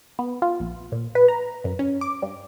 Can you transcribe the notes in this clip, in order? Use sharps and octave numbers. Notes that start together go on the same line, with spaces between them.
B3
F4
A#1
A#2
B4
A#5
F#2
C#4
D6
G2